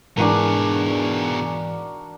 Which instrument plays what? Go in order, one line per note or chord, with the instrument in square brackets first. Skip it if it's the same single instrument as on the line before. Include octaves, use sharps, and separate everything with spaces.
[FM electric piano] G#2 E3 [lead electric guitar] B2 G#4 [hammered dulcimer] D4 F#4 A#4